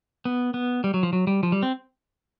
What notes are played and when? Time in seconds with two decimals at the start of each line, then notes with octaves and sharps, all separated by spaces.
0.25 B3
0.54 B3
0.84 G3
0.94 F#3
1.03 F3
1.13 F#3
1.27 G3
1.43 F3
1.52 G3
1.63 C4